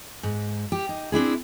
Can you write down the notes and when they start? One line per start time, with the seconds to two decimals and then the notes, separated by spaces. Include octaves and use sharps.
0.23 G#2
0.72 G4
0.89 D#4
1.12 C4 D4 E4 G#4